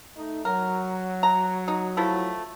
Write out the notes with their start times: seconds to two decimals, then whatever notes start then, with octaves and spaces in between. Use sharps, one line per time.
0.16 A3 D#4
0.45 F#3 A#4
1.23 A#5
1.68 D#4
1.97 F3 A3 E4